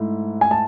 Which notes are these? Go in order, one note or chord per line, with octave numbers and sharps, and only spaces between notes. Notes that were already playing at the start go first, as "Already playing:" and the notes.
Already playing: G#2 A3 E4
G#5
A5